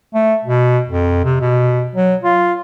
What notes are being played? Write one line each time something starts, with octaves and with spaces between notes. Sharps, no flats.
A3
B2
F2
C3
B2
F#3
F4